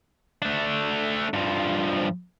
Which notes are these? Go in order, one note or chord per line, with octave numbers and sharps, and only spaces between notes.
A3 D4
G2 F3